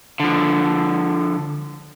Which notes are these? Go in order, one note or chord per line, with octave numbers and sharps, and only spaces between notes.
D3 F3